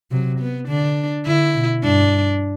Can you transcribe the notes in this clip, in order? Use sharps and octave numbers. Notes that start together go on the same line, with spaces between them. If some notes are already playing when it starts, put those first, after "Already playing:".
C3 F#3
B3
D3 D4
D3 E4
B2
G2 D4